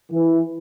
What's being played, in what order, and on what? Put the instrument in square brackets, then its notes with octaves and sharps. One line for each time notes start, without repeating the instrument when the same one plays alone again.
[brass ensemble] E3